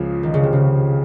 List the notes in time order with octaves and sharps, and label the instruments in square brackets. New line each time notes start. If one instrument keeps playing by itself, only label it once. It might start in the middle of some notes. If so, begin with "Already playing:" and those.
Already playing: [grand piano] C#2 C#3 F3
[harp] D#3
C#3
C3
C#3